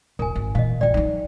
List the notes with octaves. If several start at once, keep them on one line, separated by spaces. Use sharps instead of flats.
D1 A#4 G#5
G#1
A#2 E3 D#5 F5
A#1 F#2 D5 G5
F#3 D#4